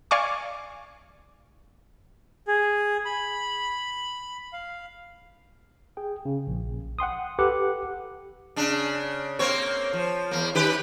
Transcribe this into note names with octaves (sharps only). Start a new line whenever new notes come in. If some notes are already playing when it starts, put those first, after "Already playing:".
D5 F5 G#5 C#6 D6
G#4
B5
F5
G#4 G5
C#3
A#1
F#5 G5 C6 D#6
G4 A4 B4 F#5 D6
C#3 D4
A#3 C4 C#5
F3
E2 A#3
D#3 G4 B4